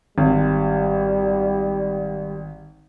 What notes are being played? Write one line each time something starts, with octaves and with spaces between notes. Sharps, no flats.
G#1 G3